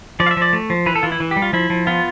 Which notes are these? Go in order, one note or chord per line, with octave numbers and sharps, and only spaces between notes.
F3 D5
F5
E5
F3 D5
A3
F3
E3 B4
A4
E3 F4
E4
E3
G4
G3
F4
F3 E4
F3
B3 F4